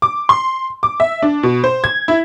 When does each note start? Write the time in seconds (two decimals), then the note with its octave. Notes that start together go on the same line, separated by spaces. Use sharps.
0.02 D6
0.29 C6
0.83 D6
1.00 E5
1.23 D4
1.43 B2
1.64 C5
1.84 G#6
2.08 E4